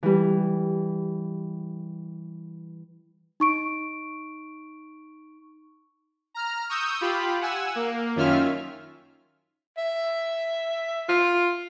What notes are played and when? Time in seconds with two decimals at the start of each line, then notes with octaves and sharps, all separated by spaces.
0.03 E3 G3
3.40 D#4 C#6 D7
6.34 A#5 F6
6.69 C#6 D#6 E6 G6
7.01 F4 G4 B5
7.41 F#5 G#5 E6
7.75 A#3
8.16 F#2 D#3 C#4 F4 E5 F6
9.77 E5
11.09 F4